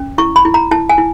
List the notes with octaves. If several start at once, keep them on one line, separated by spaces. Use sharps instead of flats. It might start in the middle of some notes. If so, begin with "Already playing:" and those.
Already playing: C#4
E4 C#6
B5
E4
A#5
E4 A5
G#5
E4